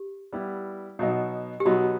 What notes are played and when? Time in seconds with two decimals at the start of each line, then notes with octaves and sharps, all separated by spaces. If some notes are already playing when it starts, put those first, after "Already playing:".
Already playing: G4
0.33 G3 B3 E4
0.99 B2 F#3 B3 D#4
1.60 G4
1.65 B2 F#3 B3 D#4 F#4